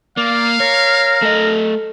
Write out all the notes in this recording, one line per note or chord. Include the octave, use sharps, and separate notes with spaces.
A#3 D5 F5
A#4 C#5
A3 A4 D#5